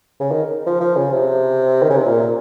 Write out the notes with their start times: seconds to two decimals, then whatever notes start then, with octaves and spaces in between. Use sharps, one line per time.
0.20 C#3
0.31 D#3
0.66 F3
0.81 F3
0.96 C#3
1.13 C3
1.82 D#3
1.90 C#3
1.97 C3
2.05 A#2